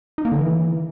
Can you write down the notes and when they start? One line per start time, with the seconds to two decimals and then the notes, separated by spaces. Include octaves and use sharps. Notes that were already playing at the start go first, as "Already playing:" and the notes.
0.18 D#4
0.25 A#3
0.32 D3
0.39 E3